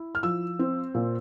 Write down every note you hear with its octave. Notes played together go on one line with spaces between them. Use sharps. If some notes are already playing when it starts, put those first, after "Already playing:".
Already playing: E4
F6
F3 E6
C4
A#2